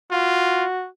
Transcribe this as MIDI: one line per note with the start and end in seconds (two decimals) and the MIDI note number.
0.11 0.65 65
0.11 0.86 66